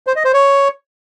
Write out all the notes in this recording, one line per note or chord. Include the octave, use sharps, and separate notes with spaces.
C5
D#5
C5
C#5